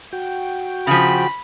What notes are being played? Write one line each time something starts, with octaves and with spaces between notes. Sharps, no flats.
F#4 G5
C#3 F3 B5